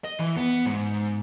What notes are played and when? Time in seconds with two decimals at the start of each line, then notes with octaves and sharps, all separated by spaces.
0.05 D#5
0.20 E3
0.37 B3
0.66 G#2